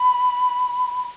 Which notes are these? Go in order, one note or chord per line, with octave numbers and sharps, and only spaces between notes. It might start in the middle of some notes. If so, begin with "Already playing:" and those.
Already playing: B5